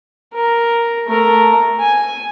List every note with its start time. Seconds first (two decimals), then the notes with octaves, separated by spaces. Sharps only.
0.34 A#4
1.08 A3 A#4
1.80 G#5